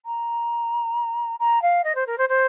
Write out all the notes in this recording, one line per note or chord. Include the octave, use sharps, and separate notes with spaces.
A#5
A#5
F5
D#5
C5
A#4
C5
C5